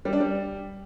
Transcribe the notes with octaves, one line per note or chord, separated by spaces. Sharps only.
G3
D4
G3